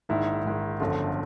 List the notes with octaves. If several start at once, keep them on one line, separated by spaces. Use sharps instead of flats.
A#1 G#2 D#3 E4
A#1 G#2 D#3
G1 F#2 D3 F3 F4